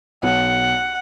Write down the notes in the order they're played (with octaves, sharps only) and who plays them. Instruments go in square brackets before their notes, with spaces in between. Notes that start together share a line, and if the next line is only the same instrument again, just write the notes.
[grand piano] B1 [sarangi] F#5